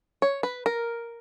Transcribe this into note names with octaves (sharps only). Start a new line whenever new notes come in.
C#5
B4
A#4